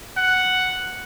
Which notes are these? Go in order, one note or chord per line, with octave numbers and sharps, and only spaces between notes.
F#5